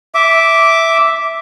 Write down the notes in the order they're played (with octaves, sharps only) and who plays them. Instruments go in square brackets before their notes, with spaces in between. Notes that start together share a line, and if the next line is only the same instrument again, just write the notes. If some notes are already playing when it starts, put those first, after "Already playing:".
[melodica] E5 D6